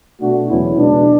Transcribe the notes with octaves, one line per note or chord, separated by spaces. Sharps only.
B2 A3 D4 F#4
E2 C#3 F#3 B3 C#4 E4
B2 G#3 B3 D4